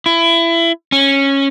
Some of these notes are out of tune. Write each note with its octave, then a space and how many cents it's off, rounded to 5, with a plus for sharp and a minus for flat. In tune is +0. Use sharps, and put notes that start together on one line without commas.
E4 +25
C#4 -10